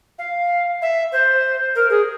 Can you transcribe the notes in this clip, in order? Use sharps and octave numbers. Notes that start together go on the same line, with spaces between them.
F5
E5
C5
A#4
G#4